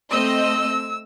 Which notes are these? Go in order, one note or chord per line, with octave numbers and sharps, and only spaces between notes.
A3 C4 D#5 E6